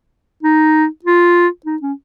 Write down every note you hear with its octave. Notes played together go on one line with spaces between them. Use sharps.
D#4
F4
D#4
C#4